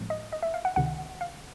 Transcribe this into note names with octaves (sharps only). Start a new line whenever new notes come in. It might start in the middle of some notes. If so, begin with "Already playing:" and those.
Already playing: A2 F3 G#3 C4
D#5
D#5
E5
F5
F#5
C#2 C3 D#3 F#5
F5